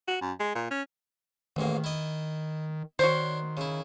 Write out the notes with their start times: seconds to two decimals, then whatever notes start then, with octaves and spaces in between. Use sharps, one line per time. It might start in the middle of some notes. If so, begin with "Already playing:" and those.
0.08 F#4
0.21 F#2
0.40 G#3
0.55 A#2
0.70 C#4
1.56 A1 G#2 D#3 A#3
1.84 E4 D#5
2.99 D#3 D4 F#4 A#4 C5 C#5
3.57 C#3 E4